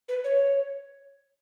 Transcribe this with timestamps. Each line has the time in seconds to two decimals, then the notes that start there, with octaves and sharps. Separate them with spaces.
0.09 B4
0.24 C#5